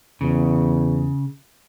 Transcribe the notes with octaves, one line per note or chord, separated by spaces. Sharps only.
E2 C#3